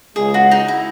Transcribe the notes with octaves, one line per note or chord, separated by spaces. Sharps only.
C#2 C#3 G#3 G#4
F#4
D#4
E4